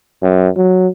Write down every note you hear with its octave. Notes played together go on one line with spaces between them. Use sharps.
F#2
F#3